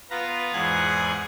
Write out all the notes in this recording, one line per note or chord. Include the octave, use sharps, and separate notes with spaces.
B3 F4 B4 A#5
E2 G#2 G#4 F#5 F#6 G#6